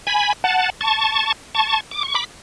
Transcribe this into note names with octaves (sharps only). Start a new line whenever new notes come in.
G#5 B5
F#5 A5
A5 C#6
A5 C#6
D6
C#6
B5 D6